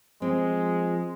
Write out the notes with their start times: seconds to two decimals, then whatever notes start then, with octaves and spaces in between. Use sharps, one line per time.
0.22 F3 G#3 C4